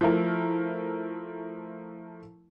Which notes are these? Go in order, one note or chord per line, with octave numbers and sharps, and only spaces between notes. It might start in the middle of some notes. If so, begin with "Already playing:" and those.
F3 A3 E4 A#4